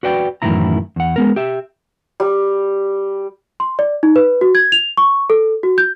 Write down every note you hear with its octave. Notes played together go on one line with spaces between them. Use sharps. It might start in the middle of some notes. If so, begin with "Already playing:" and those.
F#4 B4 D5 G5
F#2 A2 D#3 E3 E4 A#5
E2 F#5
G#3 B3 A#4
G4 E5
G3
C6
D5
D#4
B4
F#4
G#6
F7
C#6
A4
F#4
G6